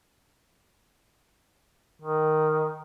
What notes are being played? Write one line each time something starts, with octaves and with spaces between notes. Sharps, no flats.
D#3